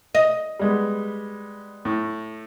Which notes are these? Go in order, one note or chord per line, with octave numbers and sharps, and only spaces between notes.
D#5
G3 G#3 B3
A2